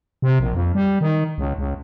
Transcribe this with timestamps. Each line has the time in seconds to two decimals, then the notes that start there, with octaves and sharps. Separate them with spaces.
0.22 C3
0.40 A#1
0.54 F2
0.75 G3
1.01 D#3
1.38 C#2
1.58 C#2